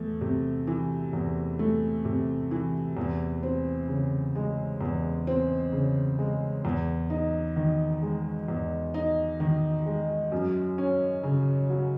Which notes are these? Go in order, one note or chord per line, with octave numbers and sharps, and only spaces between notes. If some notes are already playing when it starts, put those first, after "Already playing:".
Already playing: E2 A3
C3
E3
E2
A3
C3
E3
E2
C4
C#3
G#3
E2
C4
C#3
G#3
E2
D#4
D#3
G#3
E2
D#4
D#3
G#3
F#2
C#4
C#3
F#3